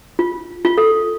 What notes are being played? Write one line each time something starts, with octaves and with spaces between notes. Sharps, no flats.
F4
F4
A4